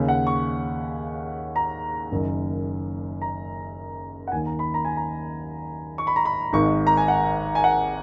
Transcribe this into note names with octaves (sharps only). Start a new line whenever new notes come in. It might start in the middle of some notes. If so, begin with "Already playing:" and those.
Already playing: D#2 C#3
F#5
C#6
A#5
F#1 F#2 D#3
A#5
F#5
D#2 D#3 G#5
A#5
B5
A#5
G#5
A#5
C#6
B5
A#5
B5
G#1 G#2 D#3 C#6
A#5
G#5
F#5
G#5
F#5